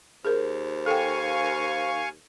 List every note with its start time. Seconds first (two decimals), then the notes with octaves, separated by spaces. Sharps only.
0.25 D#2 G#4 A#4 C5
0.86 A4 F5 G5 G#5 C#6